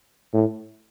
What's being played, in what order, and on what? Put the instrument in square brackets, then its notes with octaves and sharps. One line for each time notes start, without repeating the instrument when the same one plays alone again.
[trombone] A2